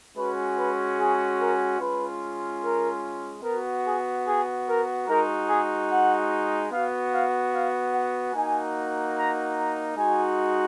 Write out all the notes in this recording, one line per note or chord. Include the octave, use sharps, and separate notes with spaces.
G#3 C#4 F#4 B4
B4
G#4
A#4
G#3 C#4 F4 B4
A#4
B3 F#4 A#4
G#4
G#4
A#4
G#3 D#4 F#4 A#4
G#4
F#5
B3 F#4 F5
F5
F5
F#5
A#3 D#4 F#4 G#5
A#5
A#5
G#3 D#4 F#4 G#5